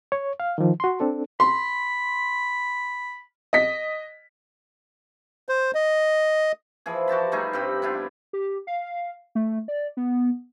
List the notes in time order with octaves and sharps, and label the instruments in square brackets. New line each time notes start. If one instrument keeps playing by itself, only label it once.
[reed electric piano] C#5
F5
D#3 F3
F#4 C6
C4 D4 A4
[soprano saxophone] B5 [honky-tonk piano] C6
[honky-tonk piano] D#5 B6
[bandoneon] C5
D#5
[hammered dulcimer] E3 F3 G#4
F#4 G4 A5 B5
G3 A3 D#4 G#4
G2 C4 G4 B5
B3 D4 E4 F4
[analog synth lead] G4
F5
A3
D5
B3